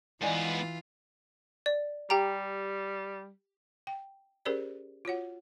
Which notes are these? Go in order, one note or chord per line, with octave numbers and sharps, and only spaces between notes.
G#2 E3 B3 F4 D5 D#5 G#5
D5
G3 G4 G5 A#5
G5
C#4 G4 G#4 A#4 C5 D5
F4 F#4 C#5 F#5